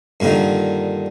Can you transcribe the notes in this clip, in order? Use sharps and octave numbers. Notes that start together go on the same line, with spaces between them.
G2 A#2 D3 D#3